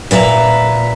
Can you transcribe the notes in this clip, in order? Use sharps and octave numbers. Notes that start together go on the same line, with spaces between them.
A#2 B4 E5 A#5